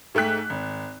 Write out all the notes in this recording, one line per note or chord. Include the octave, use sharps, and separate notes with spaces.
G#2 A3 G5 F#6 B6
G#1